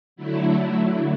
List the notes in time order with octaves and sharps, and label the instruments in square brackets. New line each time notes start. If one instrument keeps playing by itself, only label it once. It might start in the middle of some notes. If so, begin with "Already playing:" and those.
[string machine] D3 F#3 A3 E4